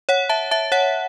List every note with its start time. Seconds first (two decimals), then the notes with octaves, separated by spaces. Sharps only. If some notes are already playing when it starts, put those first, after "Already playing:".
0.09 C#5 F#5
0.29 E5 A5
0.51 E5 A5
0.72 C#5 F#5